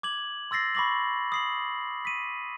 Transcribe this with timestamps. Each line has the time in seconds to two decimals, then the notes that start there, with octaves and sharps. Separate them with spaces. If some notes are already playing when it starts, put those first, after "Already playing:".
0.03 D6 G#6 F#7
0.51 C6 E6 A6 A#6 C7
0.75 B5 C#6 D6 A#6 F#7
1.32 D#6 C7 F#7
2.05 B6 D#7